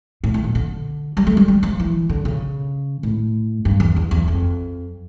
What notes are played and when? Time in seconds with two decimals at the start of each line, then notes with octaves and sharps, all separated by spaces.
0.24 A2
0.34 A2
0.44 A#2
0.55 D3
1.17 G3
1.27 A3
1.37 G3
1.48 G3
1.63 F3
1.80 E3
2.09 D3
2.25 C#3
3.03 A2
3.65 G2
3.80 E2
3.96 E2
4.11 E2
4.28 F2